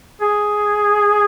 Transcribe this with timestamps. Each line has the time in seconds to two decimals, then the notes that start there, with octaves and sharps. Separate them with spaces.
0.21 G#4